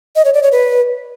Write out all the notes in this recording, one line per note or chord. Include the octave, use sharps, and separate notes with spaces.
D#5
C#5
D5
C#5
B4